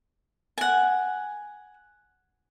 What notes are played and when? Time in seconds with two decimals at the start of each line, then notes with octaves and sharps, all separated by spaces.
0.58 F#5 G#5